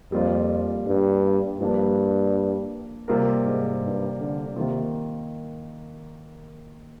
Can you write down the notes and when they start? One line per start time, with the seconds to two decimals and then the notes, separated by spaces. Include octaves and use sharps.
0.12 F2 G3 A#3 F4
0.86 G2
1.60 G2 F3 A#3 D4
3.08 C3 G3 A#3 F4 A#4
3.44 G#2
3.82 G2
4.19 D3
4.56 C3 D#3 A#3 F4